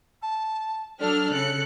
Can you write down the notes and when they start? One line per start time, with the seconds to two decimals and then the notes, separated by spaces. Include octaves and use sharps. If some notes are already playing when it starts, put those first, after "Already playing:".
0.22 A5
1.00 F#3 D4 A4 F6
1.32 C#3 F#6 C#7